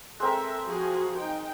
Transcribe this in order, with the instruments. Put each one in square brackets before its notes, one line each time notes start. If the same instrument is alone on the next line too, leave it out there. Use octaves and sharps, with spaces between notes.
[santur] G#3 C4 A#4 [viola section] A4 E5
[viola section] F3 F#4 G#4
D#4 G5